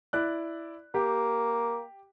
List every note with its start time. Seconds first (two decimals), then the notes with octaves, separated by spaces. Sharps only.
0.13 E4 D5 F#6
0.94 A#3 G4